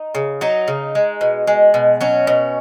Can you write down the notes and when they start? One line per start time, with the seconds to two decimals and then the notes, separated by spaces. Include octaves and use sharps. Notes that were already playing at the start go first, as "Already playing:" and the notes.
Already playing: D#4
0.15 C#3
0.41 F#3 D#4
0.68 C#3
0.95 G#3
1.21 B2
1.47 G#3
1.74 B2
2.01 F#3 C#4
2.27 B2